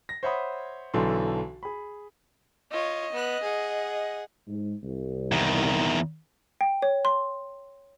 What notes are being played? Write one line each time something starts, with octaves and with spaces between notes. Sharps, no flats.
A#6
C5 C#5 E5 F#5 B5 D#6
B1 D3 E3 A4 C6
G#4 B5
F4 C#5 D#5
B3 F#6
G#4 F#5
G#2
C2
E2 D#3
G5
C#5
C6